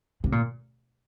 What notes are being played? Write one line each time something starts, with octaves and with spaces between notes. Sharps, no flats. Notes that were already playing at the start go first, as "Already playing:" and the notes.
C3
A#2